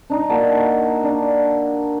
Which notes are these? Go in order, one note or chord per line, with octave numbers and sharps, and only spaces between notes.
D4 D#4
A#3 F#4 A5
D4